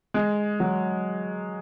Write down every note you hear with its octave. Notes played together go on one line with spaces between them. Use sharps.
G#3
F#3